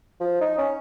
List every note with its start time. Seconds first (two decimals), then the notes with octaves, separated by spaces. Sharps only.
0.21 F3
0.41 D#4
0.58 C#4